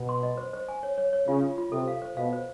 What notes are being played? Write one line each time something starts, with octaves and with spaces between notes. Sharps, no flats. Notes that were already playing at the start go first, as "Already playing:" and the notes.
Already playing: B2
C6
D#5
C5
C5
G#5
C#5
C#5
C#5
C#3 F4
F4
F4
C3 A4
F5
C5
B2 F5
C5